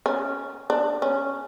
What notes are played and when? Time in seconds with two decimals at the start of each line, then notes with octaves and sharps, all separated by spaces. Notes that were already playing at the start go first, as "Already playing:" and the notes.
0.06 C#4
0.70 D4
1.02 C#4